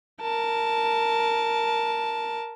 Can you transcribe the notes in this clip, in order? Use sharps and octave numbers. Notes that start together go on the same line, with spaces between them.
A#4 A5